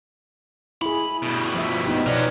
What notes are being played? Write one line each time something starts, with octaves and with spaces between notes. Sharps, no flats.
E4 G#4 B5
G2 B2
F3 E5
B3 D#4 G4
B2 C#4 A#4 D5